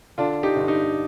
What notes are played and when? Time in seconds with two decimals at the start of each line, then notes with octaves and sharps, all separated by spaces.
0.18 D3 D4 F4
0.43 D#4 G4
0.56 G1
0.68 D#4 G4